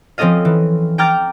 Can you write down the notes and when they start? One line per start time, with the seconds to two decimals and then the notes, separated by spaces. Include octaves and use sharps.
0.18 F3 C4 C#4 A4 D#5 F5
0.45 E3
0.98 G5 A#5 D6 F6 G6 A6